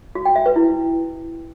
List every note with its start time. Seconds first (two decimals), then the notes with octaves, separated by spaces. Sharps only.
0.15 F#4
0.26 G5
0.36 E5
0.46 B4
0.56 E4